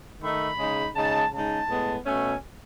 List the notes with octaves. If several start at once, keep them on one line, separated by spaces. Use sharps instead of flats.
D#3 A3 D#4 B5
C#3 G#3 D#4
C#3 G#3 D#4 A5
C#3 G#3 D#4 A5
A2 G#3 B3
B2 A3 C#4 G#5